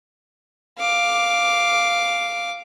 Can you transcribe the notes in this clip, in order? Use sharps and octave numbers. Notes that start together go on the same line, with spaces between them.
F5 D6